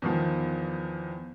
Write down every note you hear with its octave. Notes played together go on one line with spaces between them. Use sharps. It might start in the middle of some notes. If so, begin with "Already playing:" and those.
E2 D#3 F3